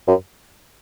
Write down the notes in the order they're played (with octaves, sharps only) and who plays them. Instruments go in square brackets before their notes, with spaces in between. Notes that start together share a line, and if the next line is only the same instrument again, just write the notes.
[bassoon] F#2